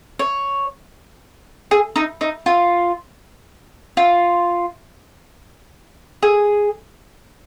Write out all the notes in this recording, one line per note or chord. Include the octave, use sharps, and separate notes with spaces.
C#5
G#4
D#4
D#4
F4
F4
G#4